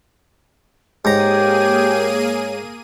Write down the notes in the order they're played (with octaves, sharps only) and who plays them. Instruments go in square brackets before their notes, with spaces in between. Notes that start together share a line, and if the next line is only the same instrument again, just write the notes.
[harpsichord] G#2 A#5 [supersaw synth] A#3 G#4 D#7 [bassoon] G4 [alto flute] C#5